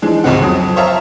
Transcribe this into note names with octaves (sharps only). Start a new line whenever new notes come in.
E3 F3 G#3 D4 D#4
G#1 C#2 C3 G#3 C4 F#5
F2 F#3 D#6
C5 C#5 E5 F5 A5 A#5